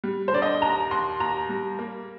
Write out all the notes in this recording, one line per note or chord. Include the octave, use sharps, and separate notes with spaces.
G3
C5
D3 D5
D#5
D#2 A#5
D#2 C6
D#2 A#5
G3
A#3